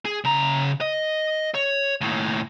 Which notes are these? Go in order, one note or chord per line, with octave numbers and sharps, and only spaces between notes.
G#4
C#3 A#5
D#5
C#5
D#2 A2